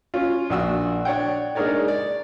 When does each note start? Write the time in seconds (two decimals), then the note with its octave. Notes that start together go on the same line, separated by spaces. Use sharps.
0.14 C#4 F4
0.50 A#1 D4 F#4 E6
1.05 D4 C#5 F#5 G5
1.55 G#3 D4 D#4 A#4 C#5 D5
1.88 D5